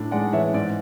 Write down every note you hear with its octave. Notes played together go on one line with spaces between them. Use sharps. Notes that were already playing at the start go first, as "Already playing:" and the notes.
Already playing: A2 D4
G#3 D5 F#5
E3 C#5 E5
G#2 D5